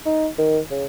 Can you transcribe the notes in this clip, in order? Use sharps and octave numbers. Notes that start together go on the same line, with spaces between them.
D#4
D#3
C#3